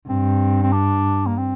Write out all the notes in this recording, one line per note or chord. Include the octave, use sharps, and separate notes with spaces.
G2 C4
C4
D4
A#3
C4